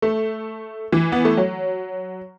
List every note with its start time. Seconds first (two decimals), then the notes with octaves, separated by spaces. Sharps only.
0.02 A3
0.92 E3
1.12 B3
1.25 A3
1.37 F#3